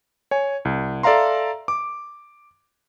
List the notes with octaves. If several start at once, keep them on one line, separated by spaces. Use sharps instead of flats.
C#5 G#5
C2
A4 D5 E5 F5 A#5 C6
D6